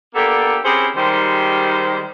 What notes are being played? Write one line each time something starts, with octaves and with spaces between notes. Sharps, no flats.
A#3 B3 D4 G4 A4
C4 C#4 E4 G4 G#4 C5
D#3 G3 G#3 G4 C5